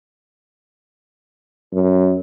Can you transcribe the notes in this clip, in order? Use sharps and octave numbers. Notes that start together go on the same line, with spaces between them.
F#2